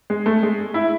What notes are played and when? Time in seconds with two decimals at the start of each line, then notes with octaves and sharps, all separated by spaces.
0.10 G#3
0.26 A3
0.43 G#3
0.74 E4